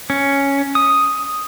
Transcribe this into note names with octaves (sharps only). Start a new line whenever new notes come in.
C#4
D#6